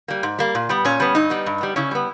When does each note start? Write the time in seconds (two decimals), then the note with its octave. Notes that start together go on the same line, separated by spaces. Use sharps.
0.08 G3 A#3
0.23 G#2
0.39 G3 A#3
0.55 A#2
0.69 G3 B3
0.85 A#2 C#4
1.00 G3 B3
1.15 G2 D#4
1.30 G3 B3
1.46 G2
1.61 G3 B3
1.76 C#3 C#4 E4
1.91 G3 B3